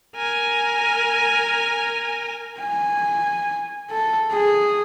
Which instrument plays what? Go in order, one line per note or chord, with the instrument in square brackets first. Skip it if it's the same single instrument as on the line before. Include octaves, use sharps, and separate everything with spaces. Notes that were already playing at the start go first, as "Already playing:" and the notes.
[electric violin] A#4 G#5
[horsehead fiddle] G#5
A4
G#4